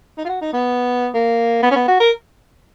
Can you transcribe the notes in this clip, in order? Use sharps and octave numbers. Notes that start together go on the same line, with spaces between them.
D#4
F4
F#4
D#4
B3
A#3
B3
C#4
B3
F#4
A#4